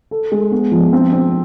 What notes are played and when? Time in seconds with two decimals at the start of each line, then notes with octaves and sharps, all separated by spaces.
0.11 A4
0.32 G#3
0.52 B3
0.72 F3
0.93 C4
1.13 C4